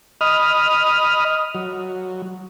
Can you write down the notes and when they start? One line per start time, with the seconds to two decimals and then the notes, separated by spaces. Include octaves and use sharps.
0.21 D#5 B5 D#6 F6
1.55 F#3